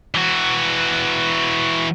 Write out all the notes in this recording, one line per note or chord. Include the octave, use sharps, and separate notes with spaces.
E3 F#4